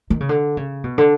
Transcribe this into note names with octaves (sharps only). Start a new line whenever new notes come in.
D#3
C#3
D3
C#3
B2
D3